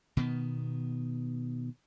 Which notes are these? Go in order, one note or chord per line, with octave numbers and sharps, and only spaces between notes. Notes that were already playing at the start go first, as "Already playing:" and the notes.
B2 D#3 B3